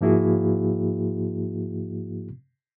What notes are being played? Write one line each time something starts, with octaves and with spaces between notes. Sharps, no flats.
G#2 F3 A#3 E4 F#4 G#4